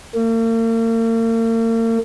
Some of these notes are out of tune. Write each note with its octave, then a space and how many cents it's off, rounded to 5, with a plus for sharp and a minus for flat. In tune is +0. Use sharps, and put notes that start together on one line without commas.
A#3 -45